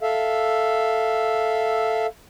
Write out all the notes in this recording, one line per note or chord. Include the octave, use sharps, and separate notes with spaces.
A4 E5 F5